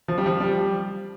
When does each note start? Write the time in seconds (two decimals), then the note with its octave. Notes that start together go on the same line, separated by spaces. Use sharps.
0.08 F3
0.18 G3
0.26 F3
0.40 G3